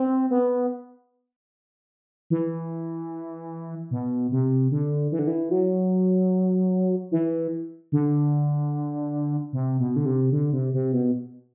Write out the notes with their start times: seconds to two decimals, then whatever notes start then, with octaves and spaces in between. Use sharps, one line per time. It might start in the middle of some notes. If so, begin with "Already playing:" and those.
Already playing: C4
0.30 B3
2.30 E3
3.91 B2
4.32 C3
4.71 D3
5.12 E3
5.19 D3
5.27 E3
5.51 F#3
7.11 E3
7.92 D3
9.53 C3
9.80 B2
9.96 D3
10.06 C3
10.32 D3
10.53 C3
10.74 C3
10.93 B2